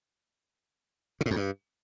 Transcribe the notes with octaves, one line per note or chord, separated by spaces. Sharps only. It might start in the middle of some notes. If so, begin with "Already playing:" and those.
C#3
A2
F2
G2